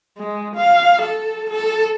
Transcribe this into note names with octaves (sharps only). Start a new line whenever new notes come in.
G#3
F5
A4
A4